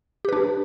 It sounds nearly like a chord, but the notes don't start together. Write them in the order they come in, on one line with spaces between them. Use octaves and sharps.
G4 B4 D4